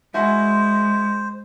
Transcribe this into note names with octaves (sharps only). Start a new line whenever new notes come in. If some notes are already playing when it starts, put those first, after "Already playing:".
G#3 E4 F#4 C5 G#5